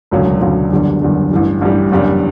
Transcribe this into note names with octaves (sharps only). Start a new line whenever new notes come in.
E1 D2 C#3 F#3
E1 D2 C#3 F#3
F#1 E2 D3 G3 D4
F#1 E2 D3 G3 D4
A1 G2 E3 G3
A1 G2 E3 G3
F#1 E2 C#3 G3 D4